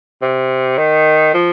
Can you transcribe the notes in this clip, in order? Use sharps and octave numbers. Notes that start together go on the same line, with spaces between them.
C3
D#3
F3